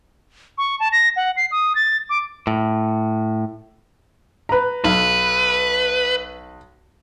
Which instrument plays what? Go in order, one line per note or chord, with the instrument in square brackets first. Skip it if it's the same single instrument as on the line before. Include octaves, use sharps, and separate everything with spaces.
[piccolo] C#6
A5
A#6
F#5
C7
D#6
A6
D6
[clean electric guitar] A2
[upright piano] B4 A#5
[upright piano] B1 [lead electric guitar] B4